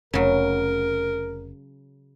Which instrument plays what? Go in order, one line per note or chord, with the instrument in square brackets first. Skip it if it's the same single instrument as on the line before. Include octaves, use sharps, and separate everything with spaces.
[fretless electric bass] F1 [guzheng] C#3 F#3 [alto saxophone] A#4